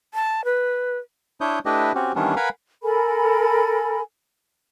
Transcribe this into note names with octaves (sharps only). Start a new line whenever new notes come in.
A5
B4
D4 E4 C#5 D#6 G6
A3 D4 E4 G4 B4 D#5
C4 C#4 F#4 G4
D#3 E3 G3 B3 C#4 D4
A#4 B4 F5 F#5 G#5 B5
A4 A#4 G#5 B5